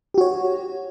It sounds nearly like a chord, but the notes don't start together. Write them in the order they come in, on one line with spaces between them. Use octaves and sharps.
G4 F#4 C#5